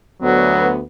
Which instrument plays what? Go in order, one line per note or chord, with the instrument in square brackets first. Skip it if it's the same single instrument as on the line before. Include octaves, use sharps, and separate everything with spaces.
[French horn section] D2 B3 [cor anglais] F#3